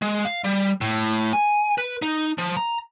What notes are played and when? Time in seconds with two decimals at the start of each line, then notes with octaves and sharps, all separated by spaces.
0.02 G#3
0.25 F5
0.44 G3
0.81 A2
1.33 G#5
1.78 B4
2.02 D#4
2.38 F3
2.57 A#5